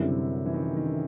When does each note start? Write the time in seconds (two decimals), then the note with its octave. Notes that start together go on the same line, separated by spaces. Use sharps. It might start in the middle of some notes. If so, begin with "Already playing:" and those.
Already playing: F#2 D3 G3 C4 E4
0.08 C3
0.46 E3
0.54 D#3
0.77 D#3